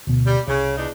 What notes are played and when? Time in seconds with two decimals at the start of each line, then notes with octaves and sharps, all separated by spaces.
0.07 D2 B2
0.26 G3
0.48 C2 C#3
0.77 E2 D4 D#4